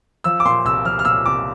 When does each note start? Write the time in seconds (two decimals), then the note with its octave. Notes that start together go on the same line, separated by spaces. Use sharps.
0.24 F3 E6
0.40 D6
0.45 A#2 C6
0.65 C2 E6
0.85 F3 F6
0.99 F6
1.05 A#2 E6
1.26 C2 D6